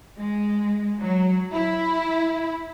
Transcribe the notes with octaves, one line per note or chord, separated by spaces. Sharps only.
G#3
F#3
E4